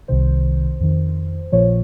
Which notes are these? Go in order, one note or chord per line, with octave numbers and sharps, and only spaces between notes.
C2 C3 D#3 C5
F2 D#3
A#1 A#2 F3 C#5